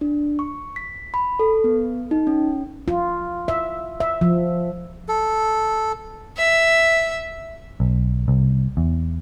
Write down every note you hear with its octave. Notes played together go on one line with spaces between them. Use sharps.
D4
C#6
B6
B5
A4
B3
D#4
C#4
F4
E5
E5
F3
A4
E5
B1
C2
E2